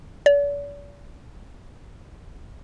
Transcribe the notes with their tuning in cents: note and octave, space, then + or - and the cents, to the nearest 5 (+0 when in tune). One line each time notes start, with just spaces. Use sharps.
D5 -45